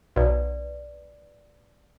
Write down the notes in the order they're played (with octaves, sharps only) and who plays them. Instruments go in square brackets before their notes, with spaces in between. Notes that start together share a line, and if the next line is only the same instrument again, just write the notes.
[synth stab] B1 [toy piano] B4 D5